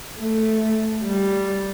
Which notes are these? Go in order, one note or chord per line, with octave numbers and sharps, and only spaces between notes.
A3
G3